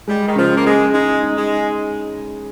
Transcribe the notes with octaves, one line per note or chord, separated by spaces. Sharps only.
G3 G#3
D#3
C#3 F3
A#3
G#3 G#4
G#3 D#4
D#4
G#3